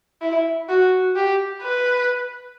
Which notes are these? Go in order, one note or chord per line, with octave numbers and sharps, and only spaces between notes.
E4
F#4
G4
B4